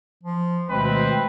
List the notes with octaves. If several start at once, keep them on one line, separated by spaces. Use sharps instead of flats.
F3
D2 B2 D#3 G#3 C4 B4